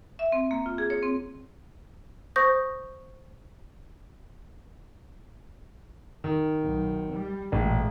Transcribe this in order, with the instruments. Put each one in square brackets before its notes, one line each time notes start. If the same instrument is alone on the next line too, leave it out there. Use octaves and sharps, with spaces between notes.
[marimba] E5
C4
A#3
F4
G#4
C#5
C4
[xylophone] C5 C#6 D#6 G6 A#6
[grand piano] D#3
[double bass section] B1
G3
[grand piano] A1 [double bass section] A#2 G#3